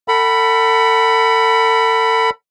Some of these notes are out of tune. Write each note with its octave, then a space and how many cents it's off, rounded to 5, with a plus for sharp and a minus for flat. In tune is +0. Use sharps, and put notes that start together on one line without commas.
A4 +35 F#5 +30 B5 +0